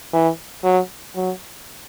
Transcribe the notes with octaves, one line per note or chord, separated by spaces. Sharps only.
E3
F#3
F#3